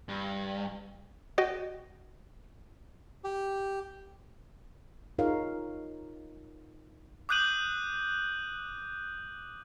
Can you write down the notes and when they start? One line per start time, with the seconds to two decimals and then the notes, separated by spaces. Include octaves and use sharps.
0.09 G2
1.38 F#4 D#5 G5
3.24 G4
5.19 D#4 F4 G#4 A#4 C#5 F5
7.29 D6 D#6 F#6 G6 D#7 F#7